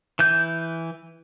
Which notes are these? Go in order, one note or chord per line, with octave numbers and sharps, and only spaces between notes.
E3 G6